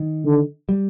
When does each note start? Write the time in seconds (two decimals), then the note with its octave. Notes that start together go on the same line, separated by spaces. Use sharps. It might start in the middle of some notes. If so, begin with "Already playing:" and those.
Already playing: D#3
0.25 D3
0.69 G3